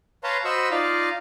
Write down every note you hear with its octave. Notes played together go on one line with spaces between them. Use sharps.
B4 C#5 F5 A5 A#5 C6
F#4 C5 D#5 B5 C#6 E6
D#4 F4 D5 D#5 F5